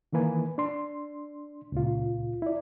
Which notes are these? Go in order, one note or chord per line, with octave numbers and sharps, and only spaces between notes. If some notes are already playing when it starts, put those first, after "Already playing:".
D#3 E3 A#3 B4 G#5
D4 C6
C#2 A#2 F4
E4 D5